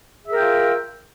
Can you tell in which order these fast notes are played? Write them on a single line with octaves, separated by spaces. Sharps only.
G#4 E5 A#4 G5 F4